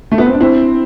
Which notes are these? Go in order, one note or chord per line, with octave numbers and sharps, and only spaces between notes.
A3
B3
C4
D4
C4 E4